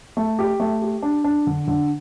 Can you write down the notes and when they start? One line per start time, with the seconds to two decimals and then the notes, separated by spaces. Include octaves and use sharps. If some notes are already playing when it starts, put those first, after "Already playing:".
0.17 A3
0.39 G4
0.60 A3
0.82 G4
1.03 D4
1.24 D4
1.47 D3
1.67 D3